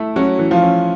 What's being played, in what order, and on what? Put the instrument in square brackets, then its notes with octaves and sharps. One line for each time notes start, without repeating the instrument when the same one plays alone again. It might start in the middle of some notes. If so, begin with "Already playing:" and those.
Already playing: [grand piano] A3 E4
[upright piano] F#3 F#4 [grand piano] C#4
[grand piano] E3
[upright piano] F3 F4
[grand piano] C#4